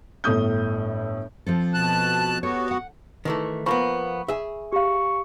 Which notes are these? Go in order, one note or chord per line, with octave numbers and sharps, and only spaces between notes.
G1 A2 A3 D#6 G6
F3 C4 A4
B2 A5 F#6
B3 F#4 G4 A4 C#5
F#5
D#3 E3 A3
F3 A#3 B3 B5 C#6
G#4 E5
G4 F5 C#6